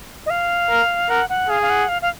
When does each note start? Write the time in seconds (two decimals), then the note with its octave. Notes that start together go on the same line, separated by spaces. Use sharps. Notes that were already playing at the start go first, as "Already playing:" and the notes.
0.26 D#5
0.30 F5
0.70 A#4
1.09 A#4 F#5
1.29 F#5
1.49 G#4 F5
1.62 F5
1.70 F#5
1.88 F5
2.02 F5